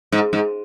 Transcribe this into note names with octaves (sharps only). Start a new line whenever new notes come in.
G#2
G#2